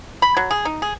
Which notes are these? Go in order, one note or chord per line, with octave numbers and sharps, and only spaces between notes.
B5
F#3
G#4
D#4
G#4